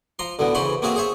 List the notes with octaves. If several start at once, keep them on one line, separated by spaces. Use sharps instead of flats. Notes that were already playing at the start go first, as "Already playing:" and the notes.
F3 A#5 C6
D2 A2 D3 B3
C#3 E3 C5 C#5 B5 C6
A#3 C4 F#4 G#4 E5
G#4 C5 C#5 E5